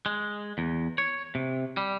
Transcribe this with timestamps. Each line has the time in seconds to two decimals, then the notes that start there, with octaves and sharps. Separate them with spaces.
0.06 G#3
0.58 E2
0.98 C#5
1.35 C3
1.77 G3